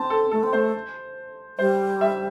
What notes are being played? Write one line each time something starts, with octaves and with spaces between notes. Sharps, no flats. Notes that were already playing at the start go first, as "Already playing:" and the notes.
Already playing: C4 A5
A4
A3 A4
C4
A3 C5
G3 C5
E5